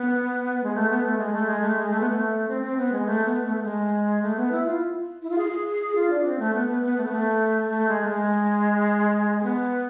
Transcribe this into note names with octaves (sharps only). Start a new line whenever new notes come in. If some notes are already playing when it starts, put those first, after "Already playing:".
Already playing: B3
G#3
A3
B3
A3
G#3
A3
G#3
A3
G#3
A3
B3
A3
C4
C4
B3
G#3
A3
B3
A3
A3
G#3
A3
B3
E4
F4
E4
F4
G#4
F4
D4
C4
A3
B3
B3
B3
A3
B3
A3
A3
G#3
A3
G#3
B3